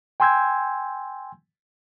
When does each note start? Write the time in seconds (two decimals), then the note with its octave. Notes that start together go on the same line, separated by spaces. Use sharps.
0.20 G5 G#5 C6 E6 G6 G#6